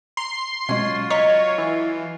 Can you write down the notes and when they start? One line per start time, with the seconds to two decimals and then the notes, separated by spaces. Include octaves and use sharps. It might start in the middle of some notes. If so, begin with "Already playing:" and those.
0.17 A#5 C6
0.69 B2 F#3 G#3 C#4 F4
1.10 C#5 D#5 A#5 C#6 B6
1.58 E3